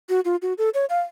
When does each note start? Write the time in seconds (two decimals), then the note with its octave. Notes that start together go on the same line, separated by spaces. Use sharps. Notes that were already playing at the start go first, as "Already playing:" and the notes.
0.09 F#4
0.25 F4
0.42 F#4
0.58 A4
0.74 C#5
0.90 F5